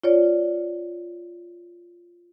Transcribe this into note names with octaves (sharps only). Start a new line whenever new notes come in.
F4 C#5 D5